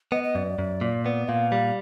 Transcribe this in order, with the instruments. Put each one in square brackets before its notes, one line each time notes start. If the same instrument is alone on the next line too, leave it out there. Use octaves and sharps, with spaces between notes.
[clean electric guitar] B3 [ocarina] D#5
[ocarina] D#5
[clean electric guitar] F#2 [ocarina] D5
[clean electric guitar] F#2
A#2
B3
[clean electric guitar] A#2 [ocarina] F5
[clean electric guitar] G3